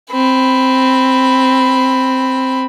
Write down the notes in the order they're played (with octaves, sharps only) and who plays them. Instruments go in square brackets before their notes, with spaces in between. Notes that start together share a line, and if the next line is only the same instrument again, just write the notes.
[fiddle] C4 B5